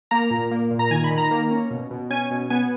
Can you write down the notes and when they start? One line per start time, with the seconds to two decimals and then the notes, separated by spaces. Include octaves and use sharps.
0.11 A#3 A#5
0.30 A#2
0.51 A#3
0.71 A#2
0.79 A#5
0.91 D#3 G#5
1.04 B5
1.10 D#3
1.18 A#5
1.31 A#3
1.51 C#4
1.71 B2
1.91 B2
2.10 C#4 G#5
2.31 B2
2.50 B3 G#5